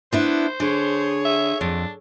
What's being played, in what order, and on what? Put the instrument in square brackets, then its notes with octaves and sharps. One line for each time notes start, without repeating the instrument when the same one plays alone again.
[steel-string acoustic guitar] B3 D4 E4 [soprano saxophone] C5
[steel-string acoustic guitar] D3 [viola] G#4 C#5
[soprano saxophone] E5
[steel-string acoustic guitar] F2 [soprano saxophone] D4